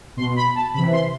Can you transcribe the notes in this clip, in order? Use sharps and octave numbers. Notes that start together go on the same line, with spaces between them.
B2 C6
B5
A5
C3 E3 B5
C6